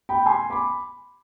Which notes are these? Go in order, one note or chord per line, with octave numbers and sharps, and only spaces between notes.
G5 B5
G#5 C6
B5 D6